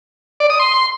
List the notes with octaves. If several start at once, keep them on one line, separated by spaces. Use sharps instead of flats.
D5
D#6
C6